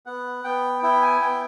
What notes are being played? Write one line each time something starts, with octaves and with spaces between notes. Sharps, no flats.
B3 F#5
B3 G5
E4 G5
G#5
B3 G5